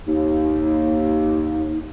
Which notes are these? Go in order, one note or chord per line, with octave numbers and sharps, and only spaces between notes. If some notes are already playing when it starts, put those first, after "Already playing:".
D#2 D#4